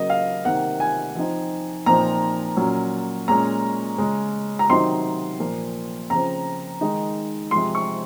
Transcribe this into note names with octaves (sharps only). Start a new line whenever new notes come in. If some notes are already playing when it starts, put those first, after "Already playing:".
Already playing: C#3 F#3 A#3 D#5
F5
C3 D#3 A#3 F#5
G#5
F3 C4 D#4
A#2 F3 C4 D#4 A#5
A#2 F#3 C#4
A#2 G#3 C#4 A#5
C#3 G#3 C#4
A#5
C3 D#3 F#3 C4 D#4 C6
A#2 F3 A#3
C#3 F3 C4 A#5
D#3 G#3 D#4
C3 F3 G#3 C6
C#6